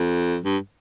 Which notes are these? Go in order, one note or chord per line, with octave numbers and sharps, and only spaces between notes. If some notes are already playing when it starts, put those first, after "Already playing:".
Already playing: F2
G2